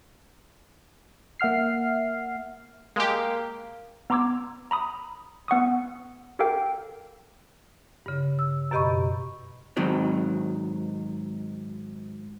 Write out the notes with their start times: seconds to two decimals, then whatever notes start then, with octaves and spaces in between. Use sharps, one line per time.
1.40 A#3 E5 F#5 F6 C7
2.96 G#3 A#3 G4
4.10 B3 A#5 C6 D6 E6 G#6
4.71 A#5 B5 D#6
5.48 B3 F#5 C#6 D#6
6.39 G4 A4 A#4 F5 G5
8.06 G2 C#3
8.39 E6
8.71 F#2 B2 G4 D#5 B5 C#6
9.77 G#2 D#3 F#3 C4